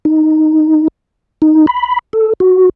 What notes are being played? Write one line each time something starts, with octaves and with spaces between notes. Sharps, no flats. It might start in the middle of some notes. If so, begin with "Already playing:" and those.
D#4
D#4
B5
A4
F#4